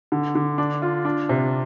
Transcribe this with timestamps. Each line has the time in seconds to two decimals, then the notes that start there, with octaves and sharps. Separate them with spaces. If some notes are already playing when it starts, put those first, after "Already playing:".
0.12 D3
0.35 D3
0.58 D4
0.82 F4
1.05 D4
1.29 C3